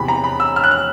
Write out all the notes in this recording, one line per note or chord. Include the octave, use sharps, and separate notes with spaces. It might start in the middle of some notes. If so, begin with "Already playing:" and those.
Already playing: E2 C3 E3 B5
A#5
B5
E6
F6
F#6
F6